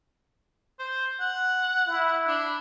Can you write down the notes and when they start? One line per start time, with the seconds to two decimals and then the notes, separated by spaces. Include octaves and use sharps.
0.79 C5
1.20 F#5
1.87 E4
2.27 D4